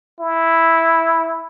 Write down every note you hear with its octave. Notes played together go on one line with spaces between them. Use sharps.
E4